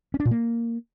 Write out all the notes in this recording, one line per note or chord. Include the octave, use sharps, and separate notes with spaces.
C#4
D4
A#2
A#3